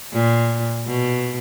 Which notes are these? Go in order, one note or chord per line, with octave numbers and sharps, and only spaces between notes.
A#2
B2